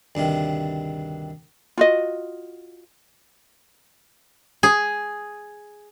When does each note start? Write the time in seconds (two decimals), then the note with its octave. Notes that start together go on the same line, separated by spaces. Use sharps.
0.15 D2 G2 C3 D#3
1.78 F4 F#4 D#5
4.63 G#4